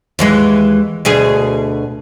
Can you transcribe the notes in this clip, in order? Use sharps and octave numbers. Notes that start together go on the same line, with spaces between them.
D#2 E3 G#3
D2 B2 G#4